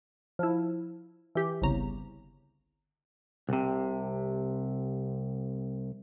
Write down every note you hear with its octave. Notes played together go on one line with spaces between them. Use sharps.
F3 E4
E3 G4
G1 C2 C#3 A#5
C2 C3